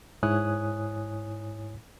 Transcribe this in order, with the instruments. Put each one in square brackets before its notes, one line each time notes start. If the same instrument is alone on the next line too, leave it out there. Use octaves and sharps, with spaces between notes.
[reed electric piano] G#2 E4 C#5 G#5 D#6 F#6